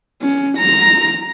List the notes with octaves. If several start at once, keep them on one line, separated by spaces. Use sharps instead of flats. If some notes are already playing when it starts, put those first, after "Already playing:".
C#4
A#5